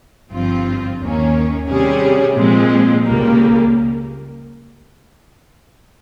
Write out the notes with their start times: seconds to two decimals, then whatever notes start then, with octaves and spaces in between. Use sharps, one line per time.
0.30 G1 G2 F3 C4 F4
1.00 D#2 D#3 A#3 C#4
1.68 C3 G3 C#4 G#4
2.36 A#2 F3 G#3 C4
3.05 C#2 C#3 G3 A#3